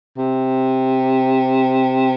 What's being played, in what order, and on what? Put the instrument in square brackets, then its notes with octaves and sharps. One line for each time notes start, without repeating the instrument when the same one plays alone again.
[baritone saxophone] C3